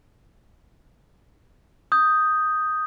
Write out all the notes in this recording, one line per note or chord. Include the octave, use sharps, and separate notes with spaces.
D#6 G6